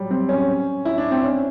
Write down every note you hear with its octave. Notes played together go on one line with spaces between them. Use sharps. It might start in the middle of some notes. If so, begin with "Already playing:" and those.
Already playing: F#3 G3
C4
C#4
E4
D4
C4
C#4